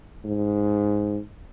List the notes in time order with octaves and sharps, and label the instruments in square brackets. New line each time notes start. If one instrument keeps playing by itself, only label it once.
[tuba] G#2